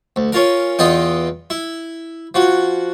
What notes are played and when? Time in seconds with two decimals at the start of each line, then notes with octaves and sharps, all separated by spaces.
0.16 D2
0.32 C#4 F4 A#4
0.79 E2 F4 D#5 G5
1.50 E4
2.34 F3 F#4